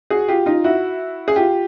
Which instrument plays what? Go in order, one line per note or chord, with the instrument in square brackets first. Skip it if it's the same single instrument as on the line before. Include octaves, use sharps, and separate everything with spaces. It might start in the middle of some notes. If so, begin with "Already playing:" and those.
[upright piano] F#4 G#4
F4 G4
D#4 F4
E4 F#4
G#4
F4 G4